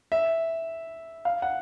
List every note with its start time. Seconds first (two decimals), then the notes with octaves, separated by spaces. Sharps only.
0.12 E5
1.25 F5
1.42 F#5